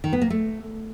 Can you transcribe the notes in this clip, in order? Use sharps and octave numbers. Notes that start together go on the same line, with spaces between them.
D#3
B3
A#3
A3